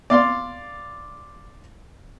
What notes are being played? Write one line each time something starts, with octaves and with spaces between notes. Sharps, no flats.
D5 F5 C6